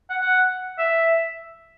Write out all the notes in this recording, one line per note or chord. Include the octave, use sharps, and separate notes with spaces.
F#5
F#5
E5